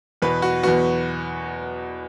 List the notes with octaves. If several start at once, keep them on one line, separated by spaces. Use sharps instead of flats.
E2 B2 B3 B4
F#4
E2 B2 B3 F#4